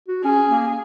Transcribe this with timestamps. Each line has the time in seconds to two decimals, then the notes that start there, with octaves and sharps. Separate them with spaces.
0.08 F#4
0.25 C#4 G#4
0.49 A#3